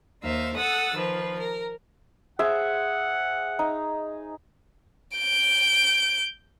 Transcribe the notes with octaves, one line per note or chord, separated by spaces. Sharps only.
D#2 D#4 C5 E5 F5
A4 F#5 D#6 E6 A6
D#3 F3 B4
A#4
G#4 C5 E5 F#5
D#4
G6 D7